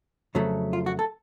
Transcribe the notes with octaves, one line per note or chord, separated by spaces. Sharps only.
F2 C#3 F#3 A3
F4
F#4
A4